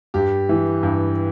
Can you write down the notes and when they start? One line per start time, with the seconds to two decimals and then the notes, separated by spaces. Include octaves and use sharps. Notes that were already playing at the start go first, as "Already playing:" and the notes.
0.14 G2 G4
0.49 E3
0.83 G2